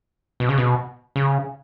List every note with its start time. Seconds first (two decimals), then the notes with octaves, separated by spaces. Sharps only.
0.40 B2
0.49 C#3
0.58 B2
1.16 C#3